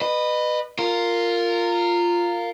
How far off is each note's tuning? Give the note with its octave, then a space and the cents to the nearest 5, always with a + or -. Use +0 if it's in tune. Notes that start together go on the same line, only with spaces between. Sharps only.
B4 +0 D#5 -30
F4 +0 A#4 -20